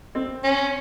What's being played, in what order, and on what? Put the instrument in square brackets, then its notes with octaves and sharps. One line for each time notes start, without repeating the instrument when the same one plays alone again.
[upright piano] C4
[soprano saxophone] C#4